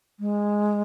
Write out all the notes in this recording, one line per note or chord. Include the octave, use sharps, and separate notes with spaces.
G#3